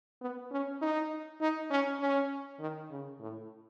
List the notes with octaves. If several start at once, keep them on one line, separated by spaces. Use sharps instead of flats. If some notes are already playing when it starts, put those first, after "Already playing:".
B3
C#4
D#4
D#4
C#4
C#4
D#3
C#3
A2